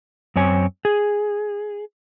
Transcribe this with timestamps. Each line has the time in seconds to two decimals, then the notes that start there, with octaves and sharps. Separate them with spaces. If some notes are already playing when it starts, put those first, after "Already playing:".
0.36 F#2 C4 C#5 G#5
0.85 G#4